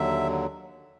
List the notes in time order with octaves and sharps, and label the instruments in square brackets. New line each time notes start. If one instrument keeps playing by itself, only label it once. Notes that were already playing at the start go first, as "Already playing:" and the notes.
Already playing: [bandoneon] D#2 D3 F#3 E5